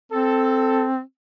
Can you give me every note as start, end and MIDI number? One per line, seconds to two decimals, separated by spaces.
0.12 1.01 60
0.12 0.86 69